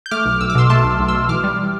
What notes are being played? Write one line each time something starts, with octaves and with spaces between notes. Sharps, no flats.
G6
A3 D6 F6
B1
B1 E6
D6
B2 C6 E6
A3 A5 C6
B1
B1
C6 E6
B2
E3 D6 F6
G3